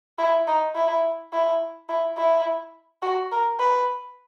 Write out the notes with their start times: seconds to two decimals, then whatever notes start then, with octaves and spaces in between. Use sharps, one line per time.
0.18 E4
0.48 D#4
0.75 E4
1.33 E4
1.89 E4
2.17 E4
3.02 F#4
3.31 A#4
3.59 B4